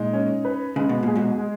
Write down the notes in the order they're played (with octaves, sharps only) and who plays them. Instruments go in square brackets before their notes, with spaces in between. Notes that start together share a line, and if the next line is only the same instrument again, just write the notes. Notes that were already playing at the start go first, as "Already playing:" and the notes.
Already playing: [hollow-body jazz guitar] A#2 [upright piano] G#3 D#4
[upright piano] C#4
B4
[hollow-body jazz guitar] C#3 [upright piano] G#3
[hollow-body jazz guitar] B2
[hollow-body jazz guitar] A#2 [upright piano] G#4
[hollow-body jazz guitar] G#2 B2
[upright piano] G#3